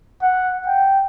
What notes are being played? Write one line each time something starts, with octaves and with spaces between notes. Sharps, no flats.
F#5
G5